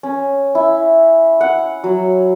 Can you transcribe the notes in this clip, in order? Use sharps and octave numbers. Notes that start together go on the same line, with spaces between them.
C#4
E4
F#5
F#3